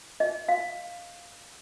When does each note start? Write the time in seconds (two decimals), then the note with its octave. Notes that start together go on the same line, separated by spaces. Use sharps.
0.20 D#5
0.48 F5